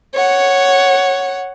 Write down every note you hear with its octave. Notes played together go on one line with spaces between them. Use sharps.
C#5 F#5